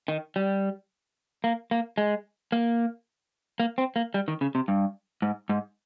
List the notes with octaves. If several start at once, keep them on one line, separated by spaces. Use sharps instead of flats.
D#3
G3
A#3
A#3
G#3
A#3
A#3
C4
A#3
G3
D#3
C#3
C3
G2
G#2
G#2